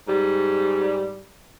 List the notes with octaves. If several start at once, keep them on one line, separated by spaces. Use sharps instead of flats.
G#2 G3